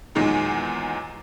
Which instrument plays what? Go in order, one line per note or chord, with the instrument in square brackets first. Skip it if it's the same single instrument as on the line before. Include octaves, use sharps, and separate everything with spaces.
[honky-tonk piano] E2 A#2 D#3 F#3 G#3 D#4